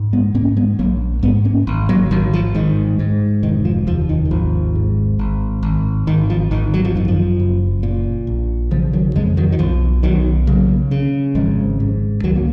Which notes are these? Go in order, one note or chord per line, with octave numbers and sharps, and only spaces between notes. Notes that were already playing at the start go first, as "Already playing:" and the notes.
Already playing: G#2
G#3 B3
G#2 A#3 C#4
G#3 B3
A#1 F#3 A#3
G#2 G#3 B3
A#3 C#4
G#1
F#3 A#3
G#1 D#3 F#3
F3
G#2 D#3
G#2
F1 D#3
F3
D#2 F3
D#3
D#3
G#1 F3
G#2
G#1
G#1
G#1 D#3
F3
G#1 D#3
F#3
F3
F#2 D#3
F3
F#1
A#2
A#1
C#3 F3
D#3 F#3
F2 F3 G#3
D#3 F#3
D#3
B1 F3
B1 D#3 F#3
C#3 F#3 A#3
C#3
G#1 F3 G#3
G#2
C#2 D#3 F#3
A#3